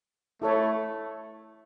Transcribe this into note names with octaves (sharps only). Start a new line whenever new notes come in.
A3 E4 A4 C#5